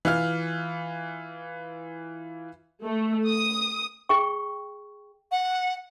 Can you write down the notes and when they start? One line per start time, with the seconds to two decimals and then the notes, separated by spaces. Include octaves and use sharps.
0.05 E3 F4 F6
2.83 A3
3.27 D#6
4.09 G#4 G5 C#6
5.32 F#5